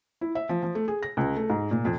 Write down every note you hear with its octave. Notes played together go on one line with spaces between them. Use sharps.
E4
E5
F3
F3
A3
G#4
A#6
C#2
A3
G#2
A#2
F2